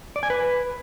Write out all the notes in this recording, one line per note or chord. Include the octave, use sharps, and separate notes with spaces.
D5
G#5
B4